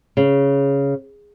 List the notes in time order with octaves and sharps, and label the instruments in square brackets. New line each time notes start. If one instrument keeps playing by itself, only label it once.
[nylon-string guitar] C#3